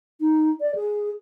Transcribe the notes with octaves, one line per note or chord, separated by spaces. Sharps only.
D#4
D5
G#4